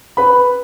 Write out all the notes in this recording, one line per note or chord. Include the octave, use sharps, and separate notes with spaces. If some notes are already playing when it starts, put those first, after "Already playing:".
B4 B5